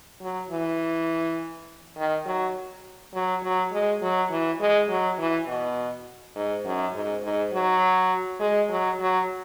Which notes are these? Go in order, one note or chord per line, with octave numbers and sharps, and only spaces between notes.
F#3
E3
D#3
F#3
F#3
F#3
G#3
F#3
E3
G#3
F#3
E3
B2
G#2
F#2
G#2
G#2
F#3
G#3
F#3
F#3